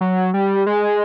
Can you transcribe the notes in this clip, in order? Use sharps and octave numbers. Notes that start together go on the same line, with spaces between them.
F#3
G3
G#3